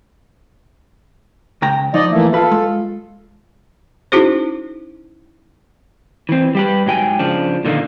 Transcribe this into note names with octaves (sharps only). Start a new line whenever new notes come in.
C#2 G5 A#5
F3 D#4 D5 D#5
E3 A3 A#3 E4
F4 A4 B4
G#3
C#4 D#4 E4 F#4 G#4 C5
E3 C4
G3 G4 B4
G#2 F#3 G5 G#5
C#3 F3 D4
A#2 D3 D#3 A#3